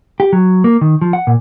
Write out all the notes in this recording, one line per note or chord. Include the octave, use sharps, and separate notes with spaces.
G4
F#3
A#3
D#3
F3
F#5
A#2